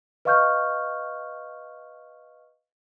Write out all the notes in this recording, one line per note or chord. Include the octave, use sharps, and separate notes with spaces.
B4 D#5 F5 C#6 F6 G6